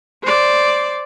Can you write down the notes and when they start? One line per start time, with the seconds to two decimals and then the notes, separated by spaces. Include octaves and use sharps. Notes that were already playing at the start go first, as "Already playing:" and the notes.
0.24 C5 D5